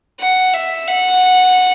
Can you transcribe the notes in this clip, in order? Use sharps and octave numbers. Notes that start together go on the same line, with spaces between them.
F#5
E5
F#5